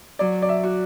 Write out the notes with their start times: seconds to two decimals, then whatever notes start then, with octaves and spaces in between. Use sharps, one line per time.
0.19 F#3 D5
0.42 D5
0.49 E5
0.63 F#4